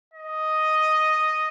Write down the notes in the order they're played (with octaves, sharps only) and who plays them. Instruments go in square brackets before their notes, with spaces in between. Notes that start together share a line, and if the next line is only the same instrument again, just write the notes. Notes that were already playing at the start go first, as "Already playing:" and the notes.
[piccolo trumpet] D#5